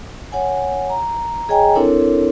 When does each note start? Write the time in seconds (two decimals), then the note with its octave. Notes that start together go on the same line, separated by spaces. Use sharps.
0.32 C#5 F#5 G#5
0.90 A#5
1.49 G#4 C#5 D#5 G5 G#5 A#5
1.75 C4 D4 E4 A4 A#4 C#5